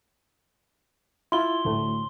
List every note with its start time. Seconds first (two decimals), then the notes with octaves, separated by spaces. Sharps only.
1.32 E4 F4 C6 G7
1.65 D2 A2 A3